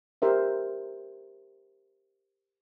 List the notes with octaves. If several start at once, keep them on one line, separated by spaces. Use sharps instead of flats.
G4 A#4 C5 E5